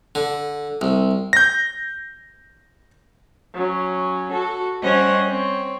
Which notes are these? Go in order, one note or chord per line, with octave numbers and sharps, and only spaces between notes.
D3
C2
G6 A#6
F#3 C#4
F#4 A4
G3 C#4 C5 C#5 D#5 F#5
C4 C#5